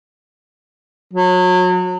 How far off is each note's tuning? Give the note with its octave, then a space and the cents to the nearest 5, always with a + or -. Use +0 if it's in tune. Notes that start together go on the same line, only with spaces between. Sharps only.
F#3 -30